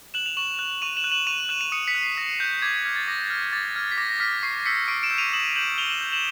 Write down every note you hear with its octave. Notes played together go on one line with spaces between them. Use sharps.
F#6 E7 F#7
F7
C#6 E7 F#7
F#6
C#6 D#7 F7
E7 F#7
F#6
E7 F#7
C#6 D#7 F7
F#6 E7 F#7
D#7 F7
D#6 C#7 D#7
B6 C#7
F#6
C7
D#6 A#6
F#6 G6
D6 G#6
F6 G#6
A6
D6 A#6
F6
D6 A6
F6 G#6
B6
D6 A#6
A#6
F6 B6
C#6 C7
E6 G6 B6 C#7
C#6 C7 D7
D7 E7
E6 G6
D#7 F7
D#6 E7 F#7
G6 E7 F#7
D#6 F7 G7
E7 F#7
G6
E7 F#7